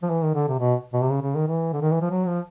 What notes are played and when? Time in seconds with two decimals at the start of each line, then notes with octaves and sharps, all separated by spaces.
0.03 F3
0.10 E3
0.23 D#3
0.35 D3
0.48 C3
0.60 B2
0.93 B2
1.02 C3
1.10 C#3
1.22 C#3
1.36 D#3
1.48 E3
1.73 D3
1.82 D#3
1.92 E3
2.01 F3
2.11 F#3
2.27 F3